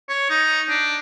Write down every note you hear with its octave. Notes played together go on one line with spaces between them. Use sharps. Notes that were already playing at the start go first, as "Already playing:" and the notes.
C#5
D#4
D4